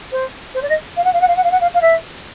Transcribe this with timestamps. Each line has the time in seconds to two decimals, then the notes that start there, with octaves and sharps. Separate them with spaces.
0.11 C5
0.54 C5
0.62 D5
0.68 D#5
0.96 F5
1.04 F#5
1.13 F5
1.21 F#5
1.27 F5
1.36 F#5
1.43 F5
1.51 F#5
1.60 F5
1.74 F5
1.81 E5